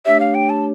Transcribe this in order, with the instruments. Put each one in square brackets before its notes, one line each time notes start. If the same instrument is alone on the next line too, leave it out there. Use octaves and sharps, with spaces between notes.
[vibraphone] A3 D4 G4 C#5 [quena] E5
[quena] F5
G5
A5